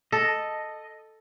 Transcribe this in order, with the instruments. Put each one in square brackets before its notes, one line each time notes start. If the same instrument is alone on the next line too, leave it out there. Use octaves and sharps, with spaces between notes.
[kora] A4 [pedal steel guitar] D#5